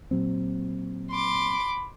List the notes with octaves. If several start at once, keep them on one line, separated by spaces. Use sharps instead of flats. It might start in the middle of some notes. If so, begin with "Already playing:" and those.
A#2 F#3 C4
B5 C6 D6